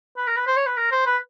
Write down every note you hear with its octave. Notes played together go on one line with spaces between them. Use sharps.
B4
A#4
B4
C5
C#5
B4
A#4
C5
B4